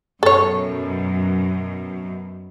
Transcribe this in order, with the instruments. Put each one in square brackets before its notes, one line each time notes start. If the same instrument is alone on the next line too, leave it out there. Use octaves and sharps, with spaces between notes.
[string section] F#2 B2 [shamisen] A4 C#5